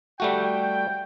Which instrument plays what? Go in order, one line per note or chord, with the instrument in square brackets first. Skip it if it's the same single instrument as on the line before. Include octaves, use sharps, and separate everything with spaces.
[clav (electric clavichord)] G3 A3 F#4 [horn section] G5